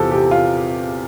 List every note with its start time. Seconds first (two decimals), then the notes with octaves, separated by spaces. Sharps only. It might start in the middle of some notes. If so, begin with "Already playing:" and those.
Already playing: E2 C3 F3 C4 G4 A4
0.11 G4
0.31 F4